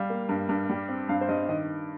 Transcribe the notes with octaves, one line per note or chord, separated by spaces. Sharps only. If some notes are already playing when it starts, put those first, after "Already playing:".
Already playing: G3 F5
A#3
G2
G2
G3
C4
G2 F5
C5
G2 D#5
D#3 D#5